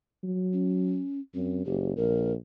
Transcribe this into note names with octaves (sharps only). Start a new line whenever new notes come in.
F#3
C#4
F#2 C4
F#1 G4
A#1 A#4